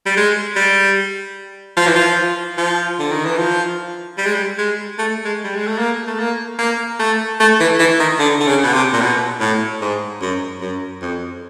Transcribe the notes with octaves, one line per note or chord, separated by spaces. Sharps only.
G3
G#3
G3
F3
E3
F3
F3
D3
D#3
E3
F3
G3
G#3
G3
G#3
A3
G#3
G3
G#3
A3
A#3
A3
A#3
A#3
A3
A3
E3
E3
D#3
D3
D3
C#3
B2
C3
A#2
B2
A2
G#2
F#2
F#2
F2